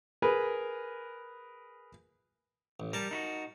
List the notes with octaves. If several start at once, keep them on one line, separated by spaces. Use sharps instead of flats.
G#4 A#4 B4
A1
G3 A#4 A5
D#4 E4 F#4